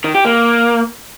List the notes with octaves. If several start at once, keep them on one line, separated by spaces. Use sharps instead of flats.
D#3
G4
A#3